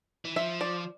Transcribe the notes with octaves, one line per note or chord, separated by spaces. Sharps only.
E3
F3 E5
D5